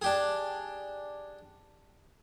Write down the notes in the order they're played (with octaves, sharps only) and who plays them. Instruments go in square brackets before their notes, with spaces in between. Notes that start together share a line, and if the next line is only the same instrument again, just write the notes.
[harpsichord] D4 G4 G#4